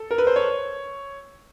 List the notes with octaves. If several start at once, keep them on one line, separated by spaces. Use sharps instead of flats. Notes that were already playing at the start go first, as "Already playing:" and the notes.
Already playing: A4
A#4
B4
C5
C#5